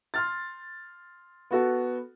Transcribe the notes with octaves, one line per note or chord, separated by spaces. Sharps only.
C6 F6 A6
B3 F#4 A4